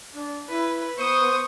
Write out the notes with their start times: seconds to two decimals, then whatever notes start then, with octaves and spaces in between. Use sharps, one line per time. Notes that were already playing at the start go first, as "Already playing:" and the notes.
0.14 D4
0.49 E4 B4
0.98 B3 C5 C#6 D#6